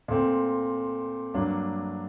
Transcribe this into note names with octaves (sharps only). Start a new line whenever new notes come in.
A#2 A3 C4
G2 F#3 A#3 D4